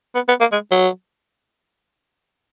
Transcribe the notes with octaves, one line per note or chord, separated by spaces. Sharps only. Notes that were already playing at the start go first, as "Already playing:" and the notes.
B3
B3
A#3
G#3
F#3